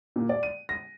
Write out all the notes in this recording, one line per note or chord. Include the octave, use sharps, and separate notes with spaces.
A#2
D5
D#7
A#6